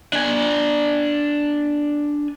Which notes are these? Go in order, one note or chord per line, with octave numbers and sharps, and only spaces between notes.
D4 G#5